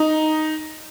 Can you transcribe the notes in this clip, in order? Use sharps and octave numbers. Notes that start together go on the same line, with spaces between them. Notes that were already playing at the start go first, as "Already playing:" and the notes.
Already playing: D#4